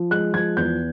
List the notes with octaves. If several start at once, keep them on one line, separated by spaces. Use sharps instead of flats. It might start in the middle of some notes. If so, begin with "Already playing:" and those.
Already playing: F3
G#3 F#6
F3 G#6
E2 G6